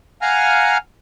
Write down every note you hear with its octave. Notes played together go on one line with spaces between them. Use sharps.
F5 F#5 G#5 A#5 F6